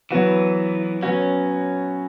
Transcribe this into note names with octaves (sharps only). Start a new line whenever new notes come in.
E3 F#3 B3 F#4
F#3 B3 C#4 F#4